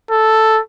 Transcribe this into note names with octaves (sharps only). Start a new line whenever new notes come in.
A4